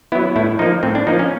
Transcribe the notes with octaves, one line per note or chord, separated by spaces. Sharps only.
F#3 B3 E4
A2 E4
F3 A#3 D#4
A2 C4
D4
F3 A#3 D#4
C#4